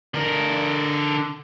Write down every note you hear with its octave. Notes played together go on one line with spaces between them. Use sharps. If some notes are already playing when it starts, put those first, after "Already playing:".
D3 A#4